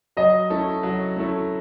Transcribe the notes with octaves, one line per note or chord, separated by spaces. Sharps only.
F#3 D#5
A3 C#4 E4 A4
F#3
A3 C#4 E4 A4